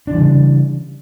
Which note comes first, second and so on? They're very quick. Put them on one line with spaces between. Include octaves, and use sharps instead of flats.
D4 E3 G3 C#3